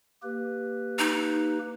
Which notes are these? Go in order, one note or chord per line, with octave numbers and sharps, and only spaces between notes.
A#3 G4 B4
D#4